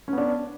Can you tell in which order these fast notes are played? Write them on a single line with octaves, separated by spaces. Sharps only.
C#4 B3 D4